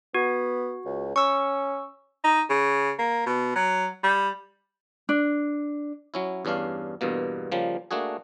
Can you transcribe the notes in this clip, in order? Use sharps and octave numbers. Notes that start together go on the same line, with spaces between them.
B3 F#4
C#2
C#4 C#6 E6
D#4
C#3
A#3
B2
F#3
G3
D4
F#3 C#4 E4
E2 G2 C#4 D4 F5
E2 G2 B2 A#3
C#3 F3 G3 A#3
A3 A#3 D4 F#4 G#4